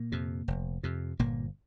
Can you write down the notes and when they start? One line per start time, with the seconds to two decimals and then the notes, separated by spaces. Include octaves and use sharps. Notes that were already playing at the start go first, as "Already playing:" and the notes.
Already playing: A#2 A#3
0.12 F2 C3
0.48 F1
0.83 F2 C3
1.19 G1 A#2 A#3